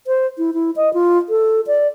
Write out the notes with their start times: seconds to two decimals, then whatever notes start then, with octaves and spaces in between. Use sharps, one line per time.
0.07 C5
0.38 E4
0.54 E4
0.76 D#5
0.94 F4
1.29 A4
1.67 D5